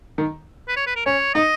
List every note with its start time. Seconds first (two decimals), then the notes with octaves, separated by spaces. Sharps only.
0.18 D#3
0.68 B4
0.76 C#5
0.87 B4
0.96 A#4
1.06 C#4 C#5
1.34 D#4 D#5